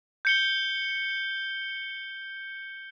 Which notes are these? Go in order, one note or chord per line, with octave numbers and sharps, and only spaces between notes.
G6 C#7 G7